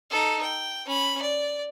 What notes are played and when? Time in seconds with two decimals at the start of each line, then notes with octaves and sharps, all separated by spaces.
0.11 D#4 A4
0.42 G5
0.87 C#4 B5
1.22 D5